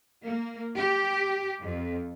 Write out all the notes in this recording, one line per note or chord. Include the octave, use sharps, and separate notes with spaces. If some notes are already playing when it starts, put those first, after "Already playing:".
A#3
G4
F2